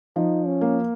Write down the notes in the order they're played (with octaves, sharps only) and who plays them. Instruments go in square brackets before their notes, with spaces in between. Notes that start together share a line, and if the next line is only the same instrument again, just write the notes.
[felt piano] F3 [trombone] D#4
[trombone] C#4
[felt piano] A#3